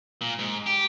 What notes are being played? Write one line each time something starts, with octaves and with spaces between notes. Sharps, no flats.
A#2
G#2
G4